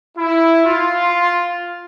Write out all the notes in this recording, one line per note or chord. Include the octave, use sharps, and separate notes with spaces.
E4
F4